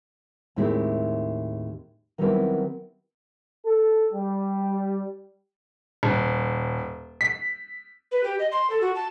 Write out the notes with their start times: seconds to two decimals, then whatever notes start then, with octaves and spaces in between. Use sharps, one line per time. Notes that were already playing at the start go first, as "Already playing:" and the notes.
0.56 D#2 A2 G#3 C4 E4 G4
2.18 D#3 F#3 G3 B3 C4 E4
3.65 A4
4.12 G3
6.03 D#1
7.21 B6
8.12 B4
8.23 G4
8.39 D#5
8.52 C6
8.70 A4
8.81 F#4
8.95 A5